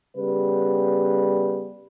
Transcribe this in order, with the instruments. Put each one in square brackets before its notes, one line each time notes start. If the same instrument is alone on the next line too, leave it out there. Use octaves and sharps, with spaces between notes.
[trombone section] C#3 G3 B3 B4